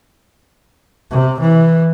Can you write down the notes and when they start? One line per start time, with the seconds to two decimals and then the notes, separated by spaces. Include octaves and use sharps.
1.11 C3
1.40 E3